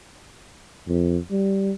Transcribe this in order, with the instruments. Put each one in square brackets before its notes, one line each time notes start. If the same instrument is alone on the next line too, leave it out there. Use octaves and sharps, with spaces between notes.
[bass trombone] F2
G3